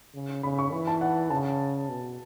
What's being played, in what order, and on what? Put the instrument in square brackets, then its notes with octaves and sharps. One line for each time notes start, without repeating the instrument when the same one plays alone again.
[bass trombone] C#3
[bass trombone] C#3 [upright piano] B5
[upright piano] C#6
[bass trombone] E3 [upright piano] B5
[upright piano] A5
F#5
[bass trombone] C#3 [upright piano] A5
[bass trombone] B2